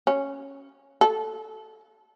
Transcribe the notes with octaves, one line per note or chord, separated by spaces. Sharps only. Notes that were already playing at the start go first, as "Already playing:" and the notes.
C#4
A4